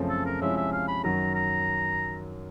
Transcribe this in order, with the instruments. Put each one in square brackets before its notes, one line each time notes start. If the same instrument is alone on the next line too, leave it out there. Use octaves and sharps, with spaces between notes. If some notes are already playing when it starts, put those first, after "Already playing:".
Already playing: [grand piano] F#2 C#3 F3 A3 C4
[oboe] A4
A#4
[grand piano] C3 F3 G#3 C#4 E4 [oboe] E5
[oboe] E5
F5
B5
[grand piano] F#2 D#3 F#3 [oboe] A#5
[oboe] A#5